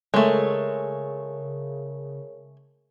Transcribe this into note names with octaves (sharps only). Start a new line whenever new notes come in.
C#3 G#3 A3 A#4 C#5